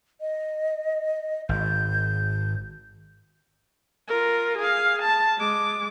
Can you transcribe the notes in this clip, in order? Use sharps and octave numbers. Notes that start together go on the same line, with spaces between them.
D#5
G#1 G6
F4 A#4
G#4 F5
A5
G#3 D6